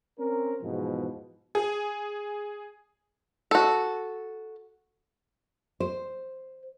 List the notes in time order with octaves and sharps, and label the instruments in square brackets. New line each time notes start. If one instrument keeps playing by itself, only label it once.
[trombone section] C4 C#4 A#4
E2 G#2 B2 F3
[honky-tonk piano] G#4
[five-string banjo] F#4 A4
[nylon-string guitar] C5